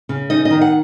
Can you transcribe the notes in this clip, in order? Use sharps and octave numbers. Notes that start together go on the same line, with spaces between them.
C#3
D#4 D#5
D#5
D#3
F#5